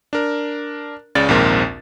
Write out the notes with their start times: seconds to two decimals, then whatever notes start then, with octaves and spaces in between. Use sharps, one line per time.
0.13 D4 A#4
1.15 C#2 C#3 C#5 D5 A6
1.29 A#1 D#2 G#2 C4 A#4 E5